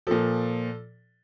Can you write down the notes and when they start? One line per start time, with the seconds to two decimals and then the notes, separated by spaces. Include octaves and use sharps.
0.07 A#2 F3 A4